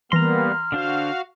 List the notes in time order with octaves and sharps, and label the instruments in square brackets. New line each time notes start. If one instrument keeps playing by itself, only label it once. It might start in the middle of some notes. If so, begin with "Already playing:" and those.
[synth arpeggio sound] E3 A#6 [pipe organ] G3 A#3 B3 [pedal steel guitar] A#5 C6 [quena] F6
[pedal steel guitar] D3 D4 C5 [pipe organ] F#4 F5